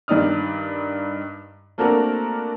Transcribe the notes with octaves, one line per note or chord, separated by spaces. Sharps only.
G2 D#3 D#4 D5 D#6 F6
A3 A#3 C4 D4 F#4 A#4